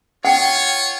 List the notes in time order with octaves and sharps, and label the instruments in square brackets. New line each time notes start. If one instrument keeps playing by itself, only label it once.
[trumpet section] F4 C#5 [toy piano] F#5 G5